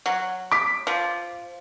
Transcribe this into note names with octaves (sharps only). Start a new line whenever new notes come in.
F#3
D6 B6
F3